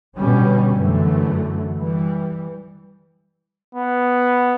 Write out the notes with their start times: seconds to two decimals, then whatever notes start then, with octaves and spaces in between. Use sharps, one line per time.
0.17 B2 D3 G3 C#4
0.75 F#2 D3 E3 A3
1.78 E3 G3
3.75 B3